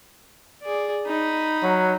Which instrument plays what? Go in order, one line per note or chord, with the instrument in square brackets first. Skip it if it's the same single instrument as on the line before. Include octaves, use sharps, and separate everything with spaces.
[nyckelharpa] G#4 D5
D#4 B5
[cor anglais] F#3